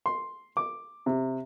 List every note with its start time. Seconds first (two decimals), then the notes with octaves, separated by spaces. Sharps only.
0.06 C6
0.57 D6
1.06 C3